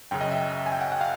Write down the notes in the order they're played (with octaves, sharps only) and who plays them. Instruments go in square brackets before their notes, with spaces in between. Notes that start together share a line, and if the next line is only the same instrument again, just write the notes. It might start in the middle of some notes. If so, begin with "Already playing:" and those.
[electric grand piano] F#2 C#3 F#3 G5
D#5
E5
G#5
G5
F#5
F#5
F5